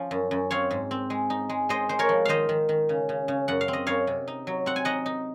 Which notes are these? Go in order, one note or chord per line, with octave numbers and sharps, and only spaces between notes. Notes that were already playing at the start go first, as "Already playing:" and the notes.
Already playing: F3 C#4
F#2
F#2
C4 C#5 F5
G#2
C4
G#3
D#4
G#3
G#3 C5 D#5
G#3 C5
A#4 C#5
F3
D#3 C5 D#5 F5
D#3
D#3
C#3
C#3
C#3
F#2 F#5
F5
C4
D#5
F#2 C#5 F5
C3
D#4
F#3
C4 F#5
G#5
D#4 D#5 F#5
D#4